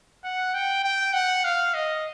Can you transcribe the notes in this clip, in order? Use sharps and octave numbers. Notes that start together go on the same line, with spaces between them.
F#5
G5
G5
F#5
F5
D#5